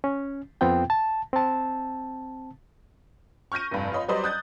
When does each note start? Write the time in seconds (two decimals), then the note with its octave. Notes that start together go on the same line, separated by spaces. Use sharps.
0.04 C#4
0.61 F2 B3 C4 F4 G5
0.90 A5
1.33 C4 A5
3.52 C#6 F6 G6 A#6 D#7
3.71 F1 G2
3.92 F4 C#5 D#5 B5
4.08 F#3 G3 B4 C5 D5 D#5
4.24 D#6 F#6 G6 A6